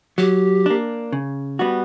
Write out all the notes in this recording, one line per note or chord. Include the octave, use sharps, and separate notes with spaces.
F#3 G4
A#3 D4
C#3
G3 B3 F#4